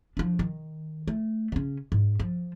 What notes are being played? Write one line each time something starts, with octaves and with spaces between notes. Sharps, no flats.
F3 D4
D#3
A3
C#3 C#4
G#2
F3